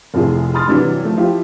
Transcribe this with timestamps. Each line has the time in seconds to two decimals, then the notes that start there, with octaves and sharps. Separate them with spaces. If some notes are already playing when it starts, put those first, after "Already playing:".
0.14 F1 C3 F3 E4 G#4
0.55 B5 C6 D#6 F6 A6
0.68 G2 C3 E3 F#3
1.05 F3 A3
1.17 F3 E4 F4 G4